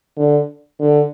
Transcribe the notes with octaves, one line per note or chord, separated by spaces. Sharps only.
D3
D3